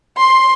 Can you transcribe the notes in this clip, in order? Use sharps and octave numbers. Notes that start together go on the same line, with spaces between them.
C6